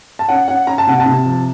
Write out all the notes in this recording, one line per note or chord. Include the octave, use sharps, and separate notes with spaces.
A5
C#4 F#5
C#4 F#5
C#4 A#5
A5
C3 F#5
A5
C3
F3